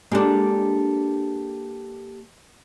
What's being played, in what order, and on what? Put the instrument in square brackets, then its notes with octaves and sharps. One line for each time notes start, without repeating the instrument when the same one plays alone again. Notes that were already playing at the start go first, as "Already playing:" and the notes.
[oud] G#3 D4 [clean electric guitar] A#3 G4 A4